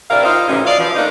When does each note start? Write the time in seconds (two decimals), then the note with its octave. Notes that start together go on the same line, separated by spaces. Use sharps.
0.10 C3 E4 A#4 D5 F5
0.24 D#4 F4 C5
0.48 F#2 A2 C3 E3 C#4
0.66 D5 D#5 F5
0.78 E3 F3
0.95 A3 A#3 D4 D#4